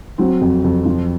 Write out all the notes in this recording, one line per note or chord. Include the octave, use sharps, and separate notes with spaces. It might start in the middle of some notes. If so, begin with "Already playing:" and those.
F#3 C4
F2
F2
F3